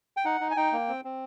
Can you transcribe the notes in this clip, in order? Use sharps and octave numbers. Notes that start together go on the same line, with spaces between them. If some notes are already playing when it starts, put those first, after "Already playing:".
G5
D#4 F#5
D#4
G#5
D#4 G5
A#3
C4
C4